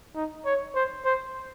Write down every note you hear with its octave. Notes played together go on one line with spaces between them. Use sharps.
D#4
C#5
C5
C5